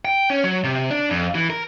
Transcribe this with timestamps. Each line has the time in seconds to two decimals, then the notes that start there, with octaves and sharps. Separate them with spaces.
0.05 G5
0.30 C#4
0.44 F#3
0.64 C3
0.91 D4
1.10 F2
1.35 E3
1.50 A#4